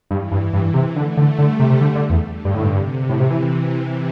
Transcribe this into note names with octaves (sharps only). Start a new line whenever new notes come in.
G2 E3
G2
G2 E3
C3
D3 A3
D3
D3 G3
C3
C3
D3
D3
E2
D3
G2
A2
G2 C3
A2 E3
C3
E3